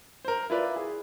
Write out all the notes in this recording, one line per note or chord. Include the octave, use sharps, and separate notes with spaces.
A#4 C5
E4 F4 B4 D5
G#4